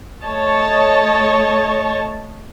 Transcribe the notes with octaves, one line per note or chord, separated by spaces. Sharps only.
A3 C#5 D#5 A5